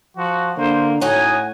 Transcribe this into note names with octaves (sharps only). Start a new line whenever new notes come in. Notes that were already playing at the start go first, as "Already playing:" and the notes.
F3 F#4
D3 A#3 C5
A2 C#4 D#4 F#4 F#5 G#5